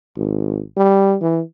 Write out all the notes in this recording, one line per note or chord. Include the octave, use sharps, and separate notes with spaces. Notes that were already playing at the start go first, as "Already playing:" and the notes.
G#1
G3
E3